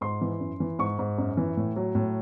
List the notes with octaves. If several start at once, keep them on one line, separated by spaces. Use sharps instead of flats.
G#2 C6
E3
F#2
E3
G#2 C#6
G#2
F#2
E3
A2
F#3
A2